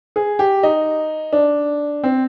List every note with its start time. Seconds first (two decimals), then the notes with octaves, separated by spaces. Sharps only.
0.16 G#4
0.39 G4
0.63 D#4
1.33 D4
2.04 C4